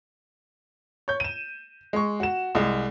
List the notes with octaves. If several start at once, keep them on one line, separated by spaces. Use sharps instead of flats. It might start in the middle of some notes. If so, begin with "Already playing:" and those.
C#5 G6
D#7 E7
G#3 C#6
F#4 E7
C2 G#3